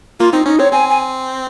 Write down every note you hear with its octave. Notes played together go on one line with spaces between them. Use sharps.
A#3 F4
C4 D#4
C#4 D#4
C4 C#5
C4 G#5
G#5